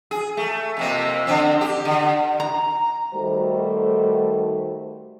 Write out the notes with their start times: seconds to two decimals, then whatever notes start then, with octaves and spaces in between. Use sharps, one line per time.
0.11 G#4
0.37 A3
0.77 F2 C3 A#3
1.27 D3 C4
1.61 G4
1.85 D3
2.40 A#5
3.14 D#3 G3 A3 F#4 A4 C5